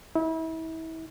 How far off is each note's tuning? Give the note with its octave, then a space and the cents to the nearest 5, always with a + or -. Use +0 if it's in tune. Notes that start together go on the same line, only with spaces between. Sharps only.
E4 -35